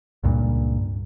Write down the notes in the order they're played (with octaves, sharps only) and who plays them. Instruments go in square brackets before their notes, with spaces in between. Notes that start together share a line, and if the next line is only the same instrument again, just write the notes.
[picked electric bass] C#2 G2 A#2